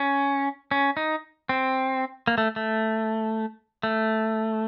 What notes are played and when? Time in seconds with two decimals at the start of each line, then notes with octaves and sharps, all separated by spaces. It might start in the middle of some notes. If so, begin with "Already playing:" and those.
Already playing: C#4
0.71 C#4
0.97 D#4
1.49 C4
2.27 A#3
2.38 A3
2.56 A3
3.83 A3